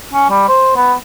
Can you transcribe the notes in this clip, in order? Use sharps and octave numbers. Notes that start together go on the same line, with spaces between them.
C#4
G3
C5
B3